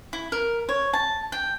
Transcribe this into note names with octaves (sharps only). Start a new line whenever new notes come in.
E4
A#4
C#5
A5
G5